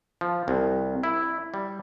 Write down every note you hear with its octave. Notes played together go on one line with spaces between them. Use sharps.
F3
C2
E4
G3